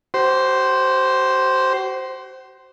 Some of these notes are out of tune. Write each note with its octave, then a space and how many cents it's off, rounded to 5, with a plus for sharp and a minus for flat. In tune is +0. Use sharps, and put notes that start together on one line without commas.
F#4 +45 C5 +0